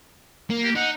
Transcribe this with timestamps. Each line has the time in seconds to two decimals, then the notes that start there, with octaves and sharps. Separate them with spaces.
0.50 A#3
0.64 G4
0.76 D#4 F#5